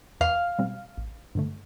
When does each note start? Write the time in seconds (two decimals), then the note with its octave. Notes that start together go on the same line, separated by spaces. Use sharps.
0.21 E2 F5
0.59 B2 G3 C4
0.97 A1
1.35 G2 D3 A3